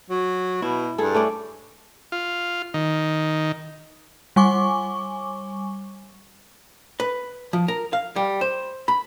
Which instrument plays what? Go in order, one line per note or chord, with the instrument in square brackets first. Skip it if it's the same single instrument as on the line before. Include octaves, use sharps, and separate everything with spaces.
[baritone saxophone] F#3
[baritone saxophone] B2 [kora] E4
[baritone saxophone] G2 [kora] G#4 A4
[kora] A3 C#4 D5
[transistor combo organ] F4
D#3
[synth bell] G3 G#5 C#6 D6
[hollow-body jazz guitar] B4
F3
A#4
F5
G3
C5
B5